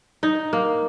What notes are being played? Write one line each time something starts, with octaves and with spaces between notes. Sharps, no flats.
D#4
A#3